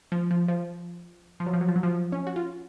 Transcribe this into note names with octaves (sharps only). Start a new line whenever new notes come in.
F3
F3
F3
F3
F#3
F3
F#3
F3
F#3
F3
C#4
F#4
F4